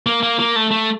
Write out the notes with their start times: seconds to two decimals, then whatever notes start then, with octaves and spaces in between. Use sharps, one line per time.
0.06 A#3
0.23 A#3
0.39 A#3
0.56 A3
0.71 A3